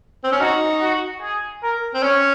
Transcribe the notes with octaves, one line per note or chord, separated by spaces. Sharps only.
C4
C#4
D#4 F#4
F#4
G#4
A#4
C4
C#4 C#5